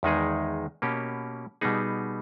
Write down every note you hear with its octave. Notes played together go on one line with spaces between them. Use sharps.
E2 D#3 G#3 D#4 G#4
B2 A#3 C#4 G4
B2 G3 B3 D#4 G#4